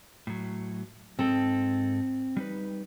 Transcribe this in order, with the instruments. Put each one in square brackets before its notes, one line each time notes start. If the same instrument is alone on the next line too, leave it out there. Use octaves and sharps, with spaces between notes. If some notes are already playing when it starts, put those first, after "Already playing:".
[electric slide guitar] A2 F#3
[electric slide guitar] G#2 A4 D#5 [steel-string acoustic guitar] C4
[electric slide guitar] G3 D#4 B4